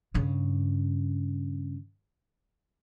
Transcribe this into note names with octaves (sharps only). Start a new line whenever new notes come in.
G2 C#3